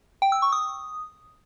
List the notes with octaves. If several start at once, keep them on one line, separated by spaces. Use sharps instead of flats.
G5
E6
C#6
D#6